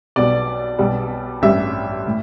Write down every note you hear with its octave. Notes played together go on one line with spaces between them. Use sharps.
B1 B2 G3 D5
B1 B2 G3
A1 G2 G3 E5
A2